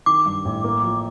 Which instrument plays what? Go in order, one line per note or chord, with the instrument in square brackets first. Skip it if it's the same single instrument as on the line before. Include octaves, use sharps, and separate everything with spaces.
[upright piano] D#3 [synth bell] D6
[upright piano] G2
A1
A#3
F3